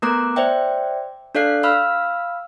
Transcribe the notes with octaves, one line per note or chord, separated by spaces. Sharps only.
A3 B3 A#4 A#5 D6 F#6
C5 D5 E5 G5
D4 A4 D5 F5 F#6 C7
F5 B5 E6 F6